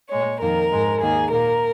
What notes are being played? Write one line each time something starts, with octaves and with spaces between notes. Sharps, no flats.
A#2 G#3 C#5
F2 D#3 A#3 A#4
G#2 G#3
D#2 D#3 A#3 G#4
A#2 A#3 A#4